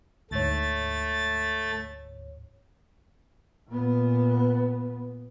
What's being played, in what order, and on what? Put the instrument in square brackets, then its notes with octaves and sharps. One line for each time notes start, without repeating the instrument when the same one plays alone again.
[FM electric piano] D2 G#2 C#5 [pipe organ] A3 A6
[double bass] A#2 B3